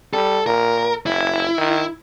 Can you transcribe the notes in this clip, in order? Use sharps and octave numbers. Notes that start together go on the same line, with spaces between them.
G3 A4
A#2 A#4
F#1 E4
D#3